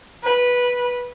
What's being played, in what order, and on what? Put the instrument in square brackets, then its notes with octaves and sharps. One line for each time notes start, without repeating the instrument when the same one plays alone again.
[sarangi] B4